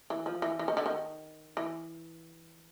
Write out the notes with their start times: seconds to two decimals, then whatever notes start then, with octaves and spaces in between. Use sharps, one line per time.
0.10 E3
0.26 F3
0.42 E3
0.59 E3
0.68 D#3
0.77 D3
0.86 D#3
1.57 E3